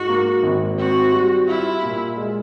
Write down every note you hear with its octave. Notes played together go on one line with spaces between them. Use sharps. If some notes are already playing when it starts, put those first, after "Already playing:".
Already playing: G#2 F#4
A#3
G#1
C4 F#4
G3
E4 F4
A#2
G#3